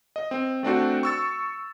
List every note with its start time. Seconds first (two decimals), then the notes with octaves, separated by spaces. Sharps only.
0.16 D#5
0.31 C4
0.63 A3 C4 D4 F#4
1.03 C#6 E6 A6